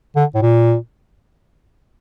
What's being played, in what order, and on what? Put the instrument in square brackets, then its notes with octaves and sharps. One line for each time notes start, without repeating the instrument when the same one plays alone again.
[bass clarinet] D3
A2
A#2